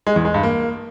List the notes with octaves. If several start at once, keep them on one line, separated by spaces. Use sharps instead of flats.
G#3
E2
G#3
G2
A#3